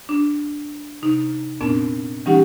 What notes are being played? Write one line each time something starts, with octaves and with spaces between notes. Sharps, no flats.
D4
C3 D#4
F2 A#2 B3 C4 D4
E3 G3 C#4 D#4 G4 F#5